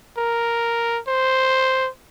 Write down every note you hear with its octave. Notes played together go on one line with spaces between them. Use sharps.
A#4
C5